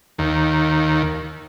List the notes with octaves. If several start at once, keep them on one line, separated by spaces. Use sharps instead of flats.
D#2